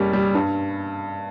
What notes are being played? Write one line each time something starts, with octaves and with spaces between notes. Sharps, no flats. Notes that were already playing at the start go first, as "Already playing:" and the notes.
Already playing: F#1 G3 C#4
G3
G2